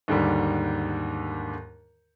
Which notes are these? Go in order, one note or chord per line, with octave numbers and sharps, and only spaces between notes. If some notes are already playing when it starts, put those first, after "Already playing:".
D#2 G#2 D3 G3